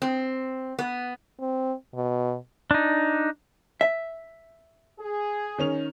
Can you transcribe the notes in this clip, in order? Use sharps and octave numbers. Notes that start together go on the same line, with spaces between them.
C4
B3
C4
B2
D4 D#4
E5
G#4
D#3 C#4 F7